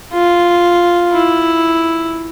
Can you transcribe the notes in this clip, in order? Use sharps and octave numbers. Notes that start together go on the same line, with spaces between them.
F4
E4